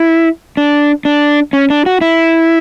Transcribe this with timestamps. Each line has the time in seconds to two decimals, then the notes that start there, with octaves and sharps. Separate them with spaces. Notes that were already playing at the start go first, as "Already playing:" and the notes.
Already playing: E4
0.57 D4
1.05 D4
1.53 C#4
1.70 D4
1.86 F#4
2.01 E4